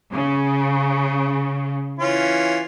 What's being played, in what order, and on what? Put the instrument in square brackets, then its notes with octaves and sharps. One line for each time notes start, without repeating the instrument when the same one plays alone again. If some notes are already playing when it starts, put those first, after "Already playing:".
[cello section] C#3
[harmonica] E3 C#4 F4